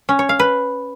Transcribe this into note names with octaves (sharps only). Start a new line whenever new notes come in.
C#4
C#5
F5
B4